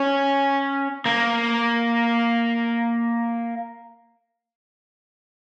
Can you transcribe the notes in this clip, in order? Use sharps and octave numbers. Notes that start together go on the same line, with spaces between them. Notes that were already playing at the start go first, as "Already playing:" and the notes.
Already playing: C#4
A#3